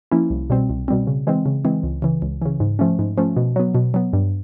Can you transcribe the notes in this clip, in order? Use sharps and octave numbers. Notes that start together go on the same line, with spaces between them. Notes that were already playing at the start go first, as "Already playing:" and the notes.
F3 A#3 C#4 E4
C2
B2 G3 C4
C2
B2 G3 C4
C#3
E3 G#3 C4
C#3
E3 G#3 C4
C#2
C#3 E3
C#2
C#3 E3
G#2
F3 A3 C#4
G#2
F3 A3 C#4
B2
F#3 B3
B2
F#3 B3
G2